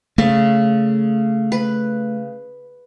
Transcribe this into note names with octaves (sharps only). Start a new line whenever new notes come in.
C#3 A3
B4